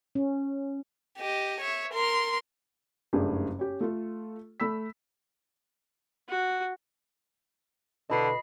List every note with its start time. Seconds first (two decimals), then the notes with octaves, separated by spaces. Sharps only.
0.15 C#4
1.18 G4 D#5
1.61 C#5 E5
1.94 A#4 C6
3.13 F#1 G2 A3 G4 G#4
3.59 C#4 G4
3.81 A3 F4 A4
4.60 A3 B5 E6 B6
6.29 F#4
8.10 B2 D3 E4 B4 D#5 B5 C7